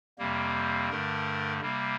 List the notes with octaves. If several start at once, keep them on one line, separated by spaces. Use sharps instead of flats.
F2 C3 G3 A#3
G2 D3 A3 A#4
C3 G3 A#3